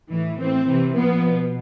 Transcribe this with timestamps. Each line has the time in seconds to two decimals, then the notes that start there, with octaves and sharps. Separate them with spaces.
0.10 A2 E3
0.38 A2 E3 C4
0.67 C3 E3
0.95 A#2 F3 B3
1.23 B2